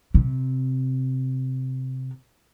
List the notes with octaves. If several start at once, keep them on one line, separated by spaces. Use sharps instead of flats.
C3